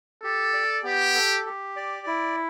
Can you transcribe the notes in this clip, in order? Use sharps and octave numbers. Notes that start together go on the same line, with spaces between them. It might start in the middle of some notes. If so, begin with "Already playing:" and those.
G4 A4
D5
B3 G4
A4
G4
D5
E4